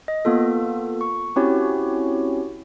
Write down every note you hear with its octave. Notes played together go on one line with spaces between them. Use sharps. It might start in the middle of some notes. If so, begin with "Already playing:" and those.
D#5
A#3 B3 F4 A4
C#6
C4 C#4 E4 F#4 G4 C#5